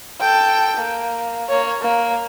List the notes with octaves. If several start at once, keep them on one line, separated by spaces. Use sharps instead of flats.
A4 G5
A#3
A#3 C#5
A#3